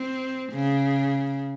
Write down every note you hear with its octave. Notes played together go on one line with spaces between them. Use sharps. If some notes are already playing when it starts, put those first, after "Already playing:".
Already playing: C4
C#3